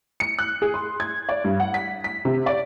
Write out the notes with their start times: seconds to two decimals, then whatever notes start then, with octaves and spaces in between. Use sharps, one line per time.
0.20 C#7
0.39 F#6
0.62 G#4
0.74 C6
1.00 G#6
1.29 D5
1.44 G2
1.60 F#5
1.74 B6
2.04 B6
2.25 C3
2.46 D5